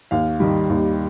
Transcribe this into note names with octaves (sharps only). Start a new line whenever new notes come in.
D#2 F5
D#3 G3
D#2